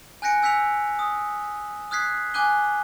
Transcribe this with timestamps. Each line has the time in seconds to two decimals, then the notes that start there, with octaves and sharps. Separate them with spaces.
0.22 G#5 F#6 G6 A#6 C#7 D7
0.42 G#5 E6 G6 B6 C#7 F7
0.99 D#6
1.91 D#6 F6 F#6 G#6 B6 C7
2.34 G#5 D6 F#6 G6 D#7 G7